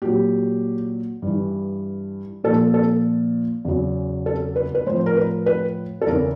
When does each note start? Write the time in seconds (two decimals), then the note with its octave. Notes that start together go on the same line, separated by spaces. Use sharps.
0.02 A#2 F#3 G4
1.22 G2 E3
2.44 A#2 F3 A4
2.74 A4
3.65 E2 C#3 F#3
4.26 A4
4.56 B4
4.75 B4
4.86 A2 F3 C5
5.06 A#4
5.17 B4
5.46 B4
6.02 A4
6.07 E2 C#3 E3 A#4